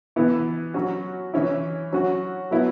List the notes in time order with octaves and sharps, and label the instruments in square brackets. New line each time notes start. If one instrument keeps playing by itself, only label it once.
[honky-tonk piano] E3 B3 E4
F#3 C#4 F#4
E3 C#4 E4
F#3 C#4 F#4
F#3 B3 E4